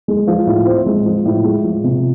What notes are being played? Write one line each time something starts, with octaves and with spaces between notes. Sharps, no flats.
G#3
F3
A2
C4
G#3
F3
A2
G#3
F3
C3